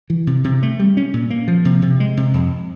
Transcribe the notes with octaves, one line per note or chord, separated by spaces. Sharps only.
E3
C3
C3
A3
G3
C#4
A#2
A#3
F3
C3
C3
G#3
C3
F2